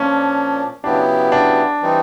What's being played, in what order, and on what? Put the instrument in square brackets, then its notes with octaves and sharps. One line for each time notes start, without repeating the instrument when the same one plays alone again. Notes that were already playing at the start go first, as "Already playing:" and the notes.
Already playing: [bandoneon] A#2 F3 A#3 D4 [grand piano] C#4
[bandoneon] C#3 F#3 B3 E4 G4 [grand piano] D4
[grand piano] D4
[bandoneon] E3 G3 C4 D#4